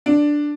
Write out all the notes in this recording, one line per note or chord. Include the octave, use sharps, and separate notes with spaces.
D4